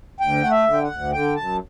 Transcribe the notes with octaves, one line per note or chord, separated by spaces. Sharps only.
D2 G5
A3 F#5
E5
D3
G5
F#5
D2
D3 G5
F#2 A5